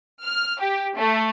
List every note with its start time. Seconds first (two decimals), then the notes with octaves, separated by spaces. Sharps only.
0.22 F6
0.58 G4
0.96 A3